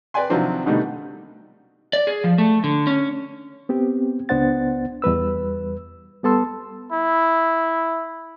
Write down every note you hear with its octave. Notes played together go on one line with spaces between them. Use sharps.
B4 D5 G5 G#5 C6
C3 D#3 F3 F#3 C4 D4
B2 D3 D#3 G3 A3 D#4
D5
G#4
F3
A3
D3
C#4
B3 C4 G4
C#2 B3 D4 C5 F#5 A6
E2 G3 B4 E6
G3 B3 A4 A5 C6 E6
E4